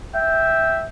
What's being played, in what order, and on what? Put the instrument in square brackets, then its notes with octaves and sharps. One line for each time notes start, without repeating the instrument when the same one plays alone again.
[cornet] E5 [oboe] G5